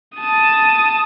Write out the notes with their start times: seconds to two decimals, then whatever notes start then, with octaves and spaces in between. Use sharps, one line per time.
0.17 A5 D#6